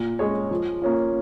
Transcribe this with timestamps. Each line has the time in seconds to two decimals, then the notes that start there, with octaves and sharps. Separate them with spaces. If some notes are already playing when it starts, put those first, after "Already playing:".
Already playing: A#2
0.19 G#3 C#4 G#4 C#5
0.51 F3
0.82 A#3 C#4 F4